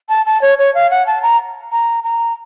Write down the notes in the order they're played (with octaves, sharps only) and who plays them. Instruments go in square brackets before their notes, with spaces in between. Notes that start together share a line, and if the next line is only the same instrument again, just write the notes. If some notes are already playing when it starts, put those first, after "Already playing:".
[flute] A5
A5
C#5
C#5
F5
F#5
A5
A#5
A#5
A#5